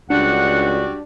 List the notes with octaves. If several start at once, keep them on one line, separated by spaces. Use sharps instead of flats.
C#2 G3 D4 F#4 D5 F#5